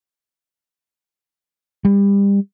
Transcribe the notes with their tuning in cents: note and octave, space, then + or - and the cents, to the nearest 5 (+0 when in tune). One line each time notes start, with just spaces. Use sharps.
G3 +30